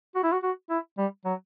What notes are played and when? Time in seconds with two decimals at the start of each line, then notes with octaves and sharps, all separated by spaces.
0.15 F#4
0.24 E4
0.33 F#4
0.43 F#4
0.70 E4
0.98 G3
1.25 F#3